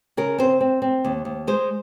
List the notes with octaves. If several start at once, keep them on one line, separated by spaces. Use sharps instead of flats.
C#3 A#4
C4 C5
C4
C4
D#2
D#2
G#3 C5